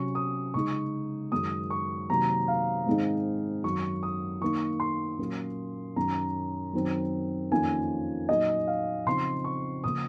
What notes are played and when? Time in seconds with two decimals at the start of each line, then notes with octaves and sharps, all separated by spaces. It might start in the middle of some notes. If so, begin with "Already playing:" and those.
Already playing: C3 F#3 C#4 C#6
0.15 D#6
0.54 C#3 G#3 D#4 C#6
1.32 F#2 D#3 G#3 D#6
1.70 C#6
2.09 C3 D#3 F#3 A#3 A#5
2.48 F5
2.86 G#2 D#3 G#3 C4 D#4
3.64 F#2 D#3 F#3 C#6
4.03 D#6
4.41 D#3 A#3 D#4 C#6
4.80 C6
5.18 A#2 F#3 A#3 C#4
5.96 F#2 D#3 F#3 C#4 A#5
6.73 F#2 D#3 F#3 C4
7.52 F2 D#3 A#3 C#4 F4 G#5
8.29 A#2 F#3 A#3 D#4 D#5
8.67 F5
9.06 C#3 F3 C4 D#4 C6
9.44 C#6
9.84 C#3 F3 A#3 D#6